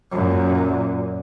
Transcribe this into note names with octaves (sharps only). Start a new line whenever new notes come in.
F#2 A#2